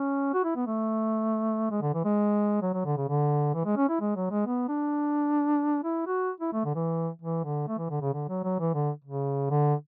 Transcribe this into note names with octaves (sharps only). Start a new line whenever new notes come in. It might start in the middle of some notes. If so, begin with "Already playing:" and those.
Already playing: C#4
F#4
E4
B3
A3
G#3
D3
E3
G#3
F#3
F#3
D3
C#3
D3
E3
G#3
C#4
E4
G#3
F#3
G#3
B3
D4
E4
F#4
E4
A3
D3
E3
E3
D3
A3
E3
D3
C#3
D3
F#3
F#3
E3
D3
C#3
D3